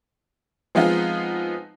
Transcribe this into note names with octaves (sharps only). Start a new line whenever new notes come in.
F3 G#3 B3 C4 D#4 F4